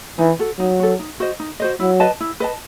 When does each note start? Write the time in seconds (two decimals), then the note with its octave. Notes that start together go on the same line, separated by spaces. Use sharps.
0.18 E3 D#4
0.39 F#4 A4
0.59 F#3 D#4
0.80 F#4 A4
0.99 D#4
1.20 F#4 C5 D#5
1.40 D#4
1.60 F#4 C5 D#5
1.80 F#3 E4
2.00 B4 D#5 A5
2.20 E4
2.40 B4 D#5 A5